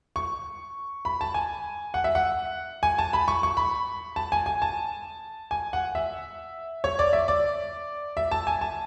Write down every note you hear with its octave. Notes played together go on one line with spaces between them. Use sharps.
C#6
B5
A5
G#5
F#5
E5
F#5
G#5
A5
B5
C#6
C#6
B5
A5
G#5
G#5
A5
G#5
F#5
E5
C#5
D5
E5
D5
E5
A5
G#5
A5